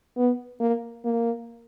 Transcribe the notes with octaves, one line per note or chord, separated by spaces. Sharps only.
B3
A#3
A#3